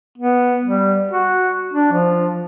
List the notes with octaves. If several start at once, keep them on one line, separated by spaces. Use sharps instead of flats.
B3
G3
F#4
D4
F3